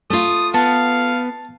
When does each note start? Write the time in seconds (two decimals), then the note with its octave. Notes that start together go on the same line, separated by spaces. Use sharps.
0.10 A3 F4 D#6
0.54 B3 F5 A5